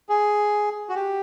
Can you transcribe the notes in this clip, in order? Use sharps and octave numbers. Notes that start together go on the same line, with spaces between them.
G#4
F#4
G4